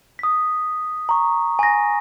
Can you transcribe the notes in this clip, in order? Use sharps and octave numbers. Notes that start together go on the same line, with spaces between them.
D#6 B6
A#5 C#6
G#5 A#6